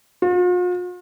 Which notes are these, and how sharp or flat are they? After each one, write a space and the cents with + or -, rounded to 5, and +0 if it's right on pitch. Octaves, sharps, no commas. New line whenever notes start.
F4 +45